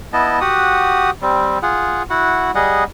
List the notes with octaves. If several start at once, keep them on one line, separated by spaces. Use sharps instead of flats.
B3 E4 D#5 A5
F#4 G4 F#5 D#6
G3 C4
F4 G#4 F#5
E4 F#4 F#5
G3 G#4 D#5 F#5